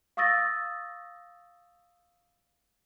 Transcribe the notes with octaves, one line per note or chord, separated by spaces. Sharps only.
F5 C#6 D#6 E6 A6 A#6